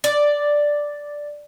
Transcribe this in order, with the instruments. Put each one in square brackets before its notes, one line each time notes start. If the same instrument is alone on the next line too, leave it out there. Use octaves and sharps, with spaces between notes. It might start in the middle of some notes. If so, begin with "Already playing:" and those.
[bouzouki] D5